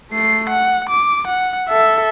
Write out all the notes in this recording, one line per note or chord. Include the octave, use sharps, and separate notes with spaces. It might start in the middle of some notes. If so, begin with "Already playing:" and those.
A3 C7
F#5
D6
F#5
A4 E5